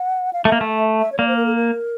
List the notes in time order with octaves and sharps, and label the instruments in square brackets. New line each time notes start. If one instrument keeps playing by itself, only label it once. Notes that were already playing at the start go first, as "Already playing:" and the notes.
Already playing: [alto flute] F#5
F5
[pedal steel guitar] A3 [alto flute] E5
[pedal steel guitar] A#3
A3
[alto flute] E5
C#5
[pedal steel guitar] A#3 [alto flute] D5
[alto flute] C5
A#4
A4
A#4